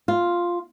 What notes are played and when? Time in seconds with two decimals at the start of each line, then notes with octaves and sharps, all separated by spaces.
0.08 F4